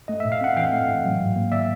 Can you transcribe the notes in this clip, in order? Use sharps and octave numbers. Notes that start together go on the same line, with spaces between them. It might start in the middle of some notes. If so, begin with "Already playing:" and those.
A3 D#5
A2 E5
F5
C4 F#5
E3 F5 G5
A3
A2
F#3
G#2
A#3
D#3 D5 E5